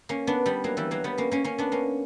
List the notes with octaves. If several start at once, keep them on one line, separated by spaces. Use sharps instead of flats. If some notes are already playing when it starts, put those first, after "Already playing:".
A#3 C#4
B3 D4
G3 B3
F#3 A#3
E3 G3
F#3 A#3
G3 B3
A#3 C#4
A#3 C#4
A#3 C#4
B3 D4
A#3 C#4